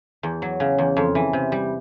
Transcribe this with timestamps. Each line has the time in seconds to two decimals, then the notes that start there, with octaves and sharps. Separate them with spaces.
0.23 E2
0.42 F#3
0.60 C#3
0.78 E2
0.97 F2
1.15 E3
1.33 C3
1.52 G3